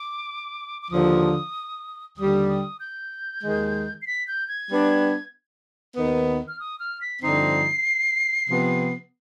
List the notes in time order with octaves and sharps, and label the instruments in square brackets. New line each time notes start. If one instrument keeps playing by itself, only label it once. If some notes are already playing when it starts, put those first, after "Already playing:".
Already playing: [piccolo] D6
D6
[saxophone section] D#2 D3 F3 [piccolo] D#6
[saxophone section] D#2 D3 G3 [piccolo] D#6
[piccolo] D#6
G6
[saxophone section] D#2 D#3 G#3
[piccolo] C7
B6
G6
G#6
[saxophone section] G3 B3 D4
D#2 D#3 B3
[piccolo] F6
D#6
F6
B6
[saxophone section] G2 D3 F3 C4 D#4 [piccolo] C7
[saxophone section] C3 F3 B3